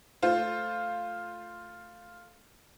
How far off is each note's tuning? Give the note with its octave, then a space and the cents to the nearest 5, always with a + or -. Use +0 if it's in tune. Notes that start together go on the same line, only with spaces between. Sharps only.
A3 +0 F4 +0 C5 +0